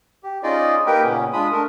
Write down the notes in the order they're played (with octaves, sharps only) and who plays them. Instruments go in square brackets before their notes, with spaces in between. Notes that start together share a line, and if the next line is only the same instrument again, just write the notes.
[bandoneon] G4
C#4 D#4 F4 G#4 D5 D#5
A#3 D#4 G4 A#4 B4 G5
A#2 C#3 B3 C#4
G#3 D4 F4 B5 D#6
A3 D4 A#4